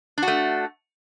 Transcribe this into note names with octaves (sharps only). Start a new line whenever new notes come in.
A3 D4 F#4